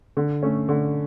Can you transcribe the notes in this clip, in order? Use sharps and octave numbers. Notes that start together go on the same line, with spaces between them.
D3
A3 C#4
D3